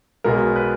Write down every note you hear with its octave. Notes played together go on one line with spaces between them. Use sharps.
B1 B2 G#3 A#4
B4